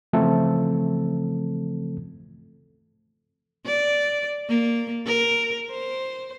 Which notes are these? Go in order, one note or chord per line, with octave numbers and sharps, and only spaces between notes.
C#3 E3 F3 A3 C4 A4
D5
A#3
A#4
C5